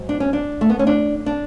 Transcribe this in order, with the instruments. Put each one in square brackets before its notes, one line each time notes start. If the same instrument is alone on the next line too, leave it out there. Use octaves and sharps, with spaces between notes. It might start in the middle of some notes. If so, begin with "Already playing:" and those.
Already playing: [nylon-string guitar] G#2 F#3
D4
C#4
D4
A3
B3
C#4
D4
D4